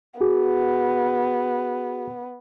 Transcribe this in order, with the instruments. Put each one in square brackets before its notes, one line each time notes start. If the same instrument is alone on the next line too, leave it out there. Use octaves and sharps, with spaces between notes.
[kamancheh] B3 [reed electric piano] F#4 G#4